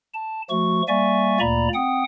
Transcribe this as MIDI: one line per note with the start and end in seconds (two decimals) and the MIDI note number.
0.14 0.42 81
0.50 0.82 53
0.50 0.82 57
0.50 0.82 66
0.50 0.82 85
0.88 1.39 55
0.88 1.39 58
0.88 1.39 74
0.88 1.39 76
0.88 1.39 80
0.88 1.39 85
1.40 1.68 38
1.40 1.68 46
1.40 1.68 58
1.40 1.68 74
1.40 1.68 82
1.40 1.68 83
1.74 2.04 60
1.74 2.04 78
1.74 2.04 79
1.74 2.04 87